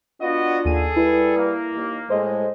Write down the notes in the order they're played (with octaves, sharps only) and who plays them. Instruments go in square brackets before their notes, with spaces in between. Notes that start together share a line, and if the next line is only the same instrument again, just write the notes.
[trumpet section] B3 F#4 D#5 [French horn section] D4 F4
[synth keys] D#2 D#7 [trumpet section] G#4 A4
[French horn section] G3 B4 [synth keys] E4
[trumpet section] A#3
[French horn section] D#2
[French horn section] A2 G#3 A4 [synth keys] C5 D#5